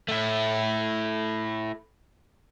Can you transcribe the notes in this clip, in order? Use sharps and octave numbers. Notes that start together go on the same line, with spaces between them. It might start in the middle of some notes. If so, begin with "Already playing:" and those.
A3 E4